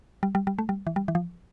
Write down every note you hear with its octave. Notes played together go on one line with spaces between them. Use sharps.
G3
G3
G3
A3
G3
E3
G3
E3
F3